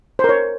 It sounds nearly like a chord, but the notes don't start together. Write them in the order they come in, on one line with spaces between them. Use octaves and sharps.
C5 A#4 C#5